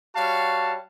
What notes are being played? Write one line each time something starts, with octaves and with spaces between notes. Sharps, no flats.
G3 F#4 C#5 F5 A5